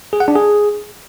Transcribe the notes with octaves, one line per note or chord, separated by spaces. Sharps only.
G#4
F#5
D4
G#4